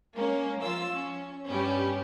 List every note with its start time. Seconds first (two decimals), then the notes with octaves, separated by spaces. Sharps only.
0.15 G#3 A#3 C#4
0.59 F3 F4 E6
0.93 C#4
1.50 G2 G3 B3 C#4 G4